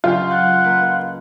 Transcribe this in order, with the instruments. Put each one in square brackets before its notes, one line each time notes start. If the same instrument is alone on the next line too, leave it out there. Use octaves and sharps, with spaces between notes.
[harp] C#2 F#3 G4 [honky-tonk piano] F4
[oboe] F#5 [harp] F#6 G6 A6
[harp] A#3 B4